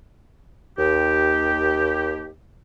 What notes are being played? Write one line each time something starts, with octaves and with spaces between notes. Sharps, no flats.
D#2 G4